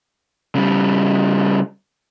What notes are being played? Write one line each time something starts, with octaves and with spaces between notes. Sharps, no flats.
C#3 G3